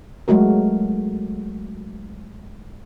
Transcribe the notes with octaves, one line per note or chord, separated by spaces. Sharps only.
F#3 G#3 A3 F#4 A#4